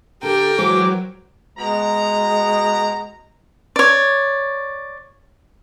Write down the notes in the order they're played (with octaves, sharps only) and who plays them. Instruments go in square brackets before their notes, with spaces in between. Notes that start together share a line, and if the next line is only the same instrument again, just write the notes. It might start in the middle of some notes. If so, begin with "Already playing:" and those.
[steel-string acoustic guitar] D3 A4 [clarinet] G4 [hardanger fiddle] A#4 G5
[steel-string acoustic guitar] E3 G#3 C5 [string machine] F#3 [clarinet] D6
[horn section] B2 A#5 [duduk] G#3
[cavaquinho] C#5 D5